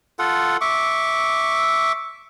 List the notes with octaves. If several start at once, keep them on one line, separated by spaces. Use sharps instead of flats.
F4 A4 F#5
E5 C#6 D6